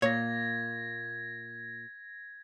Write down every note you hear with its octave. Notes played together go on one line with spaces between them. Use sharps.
A#2 C#5 G#6 A#6